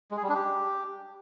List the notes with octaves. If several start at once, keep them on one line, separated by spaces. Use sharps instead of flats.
G#3
G#4
G3
D4
G4